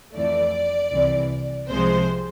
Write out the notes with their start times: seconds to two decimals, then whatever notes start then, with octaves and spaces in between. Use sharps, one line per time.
0.14 F2 E3 A3 D5
0.92 C2 C3 E3
1.69 C2 C3 F3 G#3 C5